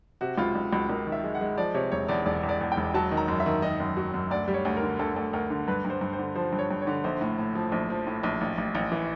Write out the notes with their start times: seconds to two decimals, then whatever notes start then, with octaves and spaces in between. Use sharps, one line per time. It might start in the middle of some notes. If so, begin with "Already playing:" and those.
0.21 C3 F#4
0.38 C#2 F4
0.55 C#2
0.72 C#2 F#4
0.89 C#2 A#4
1.06 D#3
1.12 E5
1.24 G#3
1.35 F#5
1.41 G#3
1.58 F3 D5
1.74 C3 C#5
1.92 E1 C#5
2.09 E2 D5
2.26 E1 D5
2.43 E2
2.49 D5
2.61 E2
2.72 G5
2.77 E1
2.94 F#3 A5
3.11 D#3
3.17 A#5
3.28 F#2
3.40 E5
3.46 D#3
3.62 D#3 D#5
3.80 F#2
3.97 F#3
4.14 F#2
4.30 D2 D5
4.48 G3
4.54 C#5
4.65 D2
4.77 A#4
4.82 D3
4.99 D2 A4
5.16 D2
5.33 D2 A#4
5.50 D3
5.68 G2 B4
5.85 G2
5.90 C5
6.01 G2
6.13 C5
6.19 D3
6.35 F3 C5
6.53 G2
6.59 C#5
6.71 G2
6.82 C#5
6.87 D3
7.04 A#1 C5
7.21 A2
7.38 A2
7.55 F3
7.72 A#1
7.90 F3
8.07 A2
8.23 A#1
8.41 A1
8.58 A1
8.75 A1
8.92 E3